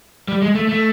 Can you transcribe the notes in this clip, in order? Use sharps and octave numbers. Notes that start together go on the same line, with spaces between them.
G3
G#3
A3
A3